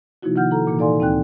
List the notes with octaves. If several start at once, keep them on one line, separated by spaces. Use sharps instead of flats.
C3 F3 A#3 D#4 E4 F#4
D#3 A#3 E4 F#5 F6 G6
E4 A4 A#5
A#2 E3 A#3
D#4 A4 D5 F5 G#5 C6
D2 C4 D#4 G5 F#6